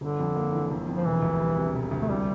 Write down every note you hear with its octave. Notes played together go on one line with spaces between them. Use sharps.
G1 D3
F2
A#3
E3
G1
F2
F3
E1 E3
D2
G3
C3
E1
D2
A3
C2 G3